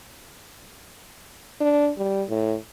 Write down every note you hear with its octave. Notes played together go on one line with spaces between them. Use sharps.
D4
G3
A2